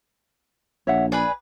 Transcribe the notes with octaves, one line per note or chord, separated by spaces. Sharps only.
A#1 C#5 E5 F#5
G#4 B4 D5 B5